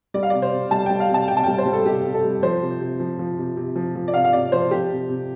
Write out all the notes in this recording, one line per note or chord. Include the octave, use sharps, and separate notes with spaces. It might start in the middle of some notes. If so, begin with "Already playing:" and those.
G3 D5
F5
D5
C3
C5
C3
G3 A5
G5
G3
F5
C3 A5
C3 G5
A5
G3 G5
C5
G3
A4
C3 G4
C3
A4
G3
F3 C5
C3
C3
F3
F3
C3
C3
F3
F3
D5
C3 F5
F5
C3 D5
F3 C5
F3 G4
C3
C3